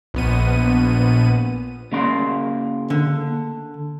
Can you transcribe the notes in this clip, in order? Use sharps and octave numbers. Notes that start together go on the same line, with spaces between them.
A#1 B3 D#7
C#3 A#3 C6
D3